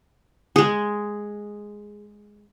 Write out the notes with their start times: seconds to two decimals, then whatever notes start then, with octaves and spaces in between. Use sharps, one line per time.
0.56 G#3 G#4